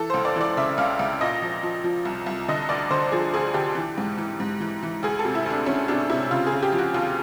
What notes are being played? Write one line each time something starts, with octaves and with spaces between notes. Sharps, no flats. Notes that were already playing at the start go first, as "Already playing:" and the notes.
Already playing: E3 A4
C#2 C5
D5
E3 D5
C#3 E5
C#2 F5
C#2
A#2 D#5
F3
F3
F3
C2
C2
D3 D#5
D2 D5
D3 C5
F3 G#4
D2 G#4
D3 G4
E3
G#2
E3
G#2
E3
E3
D2 G#4
A4
C3
E4
D2 D4
D2 C#4
C3 D4
C3 E4
C#3 F4
G#4
C#3
G4
F3
F#4
D#2 F4